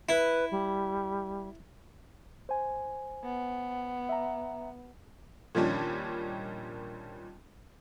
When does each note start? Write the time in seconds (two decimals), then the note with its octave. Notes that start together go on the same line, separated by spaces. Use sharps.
0.09 E4 B4
0.51 G3
2.49 C5 G#5
3.24 B3
4.09 E5 A#5
5.55 A#2 D#3 F3 G3 C#4 D4